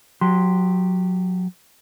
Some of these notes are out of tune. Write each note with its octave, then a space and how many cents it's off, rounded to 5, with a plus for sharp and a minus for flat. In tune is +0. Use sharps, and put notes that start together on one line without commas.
F#3 -20 G4 +0 C6 +0